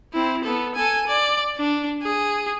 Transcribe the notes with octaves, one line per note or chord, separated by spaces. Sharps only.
C4 E4
B3 A4
A4 G#5
D5
D4
G#4